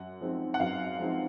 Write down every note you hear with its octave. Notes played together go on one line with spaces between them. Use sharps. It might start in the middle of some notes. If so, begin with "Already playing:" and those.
Already playing: F#2 F#5
F3 G#3 C4 D#4
F#5
F#2 F5
F3 G#3 C4 D#4